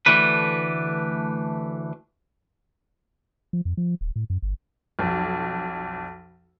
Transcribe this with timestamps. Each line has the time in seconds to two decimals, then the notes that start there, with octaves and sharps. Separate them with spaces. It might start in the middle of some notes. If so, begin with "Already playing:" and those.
0.06 D2 E3 A3 D4 B4
3.53 F3
3.65 F2
3.77 F3
4.01 D1
4.16 A2
4.30 F#2
4.42 G1
4.99 B1 F2